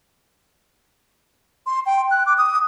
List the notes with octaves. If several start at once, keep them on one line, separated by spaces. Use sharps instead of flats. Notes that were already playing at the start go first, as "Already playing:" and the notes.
C6
G5
F#6
D6
D#6